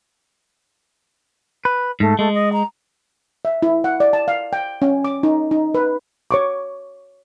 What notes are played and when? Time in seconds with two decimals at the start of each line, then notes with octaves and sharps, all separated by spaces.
1.65 B4
2.00 G#2 A3
2.19 G#3 A3
2.35 D#5
2.53 A#5
3.45 E5
3.62 E4
3.84 F#5
4.00 D5
4.13 A5
4.28 F5
4.53 G5
4.82 C#4
5.04 D6
5.23 D#4
5.51 D#4
5.75 B4
6.31 C#5 C#6 D6